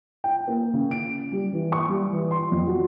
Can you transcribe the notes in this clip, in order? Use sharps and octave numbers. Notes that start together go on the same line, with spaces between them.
G5
A#3
C#3
D7
G3
E3
C#6
G3
E3
C6
F2
F#4